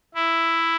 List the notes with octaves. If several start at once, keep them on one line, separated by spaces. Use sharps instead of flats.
E4